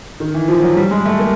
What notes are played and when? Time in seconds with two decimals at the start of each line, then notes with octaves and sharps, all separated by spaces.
0.20 D#3
0.34 E3
0.48 F3
0.63 F#3
0.77 G3
0.91 G#3
1.05 A3
1.19 A#3